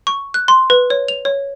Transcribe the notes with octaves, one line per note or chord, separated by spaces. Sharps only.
C#6
F#6
C6
B4
C#5
F7
C#5